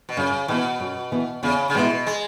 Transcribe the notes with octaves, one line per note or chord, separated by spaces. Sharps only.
B2
F#2 C#3
B2 E3 B3
F#2
E3 B3
E2 C#3
C#3
B2 E3 G#3 B3 E4
G#3